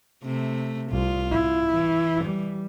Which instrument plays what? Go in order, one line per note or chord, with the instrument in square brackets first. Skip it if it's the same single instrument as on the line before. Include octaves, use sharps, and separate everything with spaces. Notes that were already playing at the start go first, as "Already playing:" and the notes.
[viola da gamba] C3 A3
[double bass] C2 [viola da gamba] F4
[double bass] E4
[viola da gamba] E3
[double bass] G3